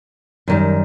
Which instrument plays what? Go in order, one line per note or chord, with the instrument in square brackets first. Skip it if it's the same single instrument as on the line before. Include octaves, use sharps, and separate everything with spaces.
[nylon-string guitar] F#2 D#3 G3